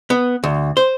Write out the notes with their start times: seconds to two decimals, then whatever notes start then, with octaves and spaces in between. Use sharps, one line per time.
0.10 B3
0.44 D2
0.77 C5